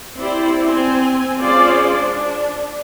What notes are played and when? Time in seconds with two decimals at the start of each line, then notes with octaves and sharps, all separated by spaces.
0.17 C4 E4 G4 C5 D5
0.66 C4 G#5
1.41 G#3 C#4 F4 G#4 C5 D5
1.97 D4